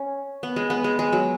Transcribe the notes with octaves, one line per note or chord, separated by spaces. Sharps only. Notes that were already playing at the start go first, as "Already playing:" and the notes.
Already playing: C#4
B3
G#3
B3
G#3
G#3
F#3